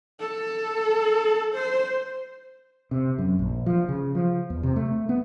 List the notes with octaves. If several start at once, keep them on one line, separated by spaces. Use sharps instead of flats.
A4
C5
C3
F#2
A#1
F3
C#3
F3
E2
C3
A3
B3